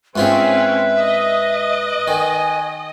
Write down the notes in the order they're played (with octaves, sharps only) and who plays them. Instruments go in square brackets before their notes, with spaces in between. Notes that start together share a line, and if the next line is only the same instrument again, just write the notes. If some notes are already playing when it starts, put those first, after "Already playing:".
[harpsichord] G#2 F4 G#4 [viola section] C4 C#4 [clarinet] B4 [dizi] E5
[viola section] D#5
[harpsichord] D#3 [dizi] G#5